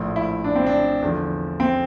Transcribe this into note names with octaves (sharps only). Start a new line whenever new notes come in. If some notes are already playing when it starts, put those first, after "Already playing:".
Already playing: A#1 A2 F3
E4
D4
C4
D4
E2 D3 F3
C4